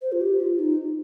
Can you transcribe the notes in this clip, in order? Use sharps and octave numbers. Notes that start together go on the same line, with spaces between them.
C5
F4
G4
F4
D#4